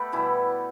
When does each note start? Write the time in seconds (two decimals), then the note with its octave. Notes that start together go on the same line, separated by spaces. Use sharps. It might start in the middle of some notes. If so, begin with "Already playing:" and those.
Already playing: A3 B3 G4 A4 B4
0.12 B2 E3 G3 E4